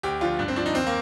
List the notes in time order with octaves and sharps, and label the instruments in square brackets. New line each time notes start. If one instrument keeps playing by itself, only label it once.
[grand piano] D2 G4
D3 F3 F4
G2 D4
C4
F3 D4
D#4
D#2 C4
A#3